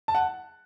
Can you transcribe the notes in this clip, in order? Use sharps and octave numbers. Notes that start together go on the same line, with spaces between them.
A5
F#5